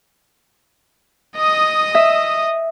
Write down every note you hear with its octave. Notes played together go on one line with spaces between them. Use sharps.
D#5 D#6
E5